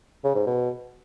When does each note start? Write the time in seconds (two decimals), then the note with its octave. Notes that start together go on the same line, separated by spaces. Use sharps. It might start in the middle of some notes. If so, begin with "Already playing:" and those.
0.24 C#3
0.36 G#2
0.47 B2